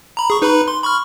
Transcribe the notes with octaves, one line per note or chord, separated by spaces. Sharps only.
A#5 B5
G#4 C#6
D#4 B4 B5
C6
B5 C#6 F6